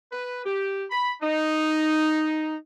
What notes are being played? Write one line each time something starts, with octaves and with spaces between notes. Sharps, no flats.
B4
G4
B5
D#4